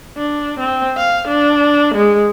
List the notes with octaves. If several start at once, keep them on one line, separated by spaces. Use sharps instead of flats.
D4
C4
F5
D4
G#3